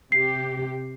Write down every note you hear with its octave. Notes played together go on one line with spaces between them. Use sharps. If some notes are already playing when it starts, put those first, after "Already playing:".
C3 G4 C7